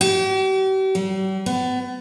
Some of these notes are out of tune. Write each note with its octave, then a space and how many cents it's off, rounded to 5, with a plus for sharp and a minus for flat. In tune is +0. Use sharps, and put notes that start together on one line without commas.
G4 -45
G3 -40
B3 +30